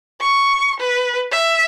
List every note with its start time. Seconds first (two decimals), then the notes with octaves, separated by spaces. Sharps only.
0.21 C#6
0.80 B4
1.32 E5